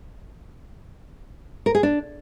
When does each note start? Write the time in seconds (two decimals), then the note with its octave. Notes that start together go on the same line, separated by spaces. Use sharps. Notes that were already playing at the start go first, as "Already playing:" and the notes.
1.66 A#4
1.75 G#4
1.83 D4